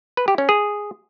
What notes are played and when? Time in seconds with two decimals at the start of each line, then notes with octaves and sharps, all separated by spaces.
0.17 B4
0.28 G4
0.38 C#4
0.49 G#4